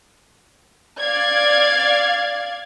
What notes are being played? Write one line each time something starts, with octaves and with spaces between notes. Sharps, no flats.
D5 F5 G#6